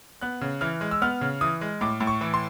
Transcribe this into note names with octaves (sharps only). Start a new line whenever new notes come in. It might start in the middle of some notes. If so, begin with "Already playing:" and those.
B3 F#6
C#3
E3 F6
G#3
E6
B3 F6
C#3
E3 D#6
G#3
A2 D6
A2
C#6
E3
C6